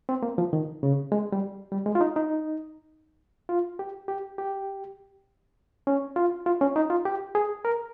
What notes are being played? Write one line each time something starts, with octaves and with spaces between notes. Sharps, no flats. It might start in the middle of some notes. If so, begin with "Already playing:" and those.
C4
A#3
F3
D#3
C#3
G#3
G3
G3
G#3
F4
D#4
D#4
F4
G4
G4
G4
C#4
F4
F4
C#4
D#4
F4
G4
G#4
A#4